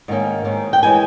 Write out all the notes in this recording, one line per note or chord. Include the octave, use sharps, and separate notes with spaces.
G#2 D#3 A#3 C#4
G#2 D#3 A#3 C#4
G5
E3 G#3 C#4 G#5